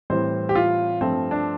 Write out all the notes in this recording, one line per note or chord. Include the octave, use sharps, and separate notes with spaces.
A2 E3 G3 C4 C5
G4
F4
G2 F3 A3 C4
D4